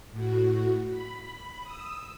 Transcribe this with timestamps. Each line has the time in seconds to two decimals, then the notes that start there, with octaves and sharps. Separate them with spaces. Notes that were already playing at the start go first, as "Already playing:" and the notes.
0.11 A2 F#4
0.90 B5
1.61 D#6 E6